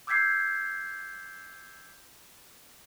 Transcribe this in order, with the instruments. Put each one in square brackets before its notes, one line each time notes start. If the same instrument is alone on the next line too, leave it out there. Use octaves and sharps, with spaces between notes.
[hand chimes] D6 E6 G6 G#6 B6 C7